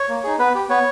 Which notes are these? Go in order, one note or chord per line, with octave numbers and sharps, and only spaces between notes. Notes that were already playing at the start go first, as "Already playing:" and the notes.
Already playing: C#5
A#3
D#4 G#4
B3 B4
G4
B3 C#5